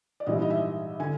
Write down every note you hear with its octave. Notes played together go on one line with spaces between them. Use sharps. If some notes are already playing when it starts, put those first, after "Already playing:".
D5
A#1 G#2 E3 G3 D#5
D#5
E5
D3 G#5